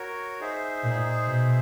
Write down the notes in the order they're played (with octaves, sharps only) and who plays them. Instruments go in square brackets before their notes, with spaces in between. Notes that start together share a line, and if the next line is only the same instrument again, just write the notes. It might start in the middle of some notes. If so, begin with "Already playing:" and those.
Already playing: [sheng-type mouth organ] F#4 A#4 C#5
D#4 G#4 C5 E5
[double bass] A#2
B2